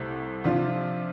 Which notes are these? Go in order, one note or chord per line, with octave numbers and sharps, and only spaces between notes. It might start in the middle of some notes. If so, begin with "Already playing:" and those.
Already playing: C2 C3 A3
C3 F3 D4 F4